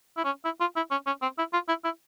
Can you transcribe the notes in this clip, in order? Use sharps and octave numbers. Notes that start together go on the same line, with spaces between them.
E4
C#4
E4
F4
E4
C#4
C#4
C4
E4
F4
E4
E4